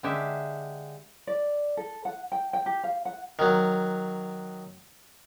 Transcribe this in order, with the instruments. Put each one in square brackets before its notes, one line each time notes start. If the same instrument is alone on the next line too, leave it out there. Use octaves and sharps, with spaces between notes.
[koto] D3 G#3 G4 E5
[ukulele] D5
A4
F#5
G5
G5
G4
F5
F#5
[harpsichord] D#3 F#3